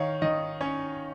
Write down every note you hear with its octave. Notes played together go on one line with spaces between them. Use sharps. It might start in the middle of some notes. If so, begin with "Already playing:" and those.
Already playing: D#3 C#5 F5
D#3 D#5
C#4 C#5